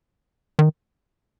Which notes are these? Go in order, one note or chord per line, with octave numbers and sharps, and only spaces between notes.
D#3